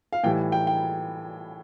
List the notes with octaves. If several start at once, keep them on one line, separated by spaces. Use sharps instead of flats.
F5
A2 E3 G3 G5
G5
G5